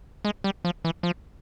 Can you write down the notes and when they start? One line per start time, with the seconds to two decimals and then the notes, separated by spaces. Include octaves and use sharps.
0.25 G#3
0.44 G3
0.65 F3
0.85 E3
1.03 F3